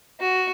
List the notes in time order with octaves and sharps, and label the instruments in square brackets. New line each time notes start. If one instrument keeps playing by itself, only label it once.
[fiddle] F#4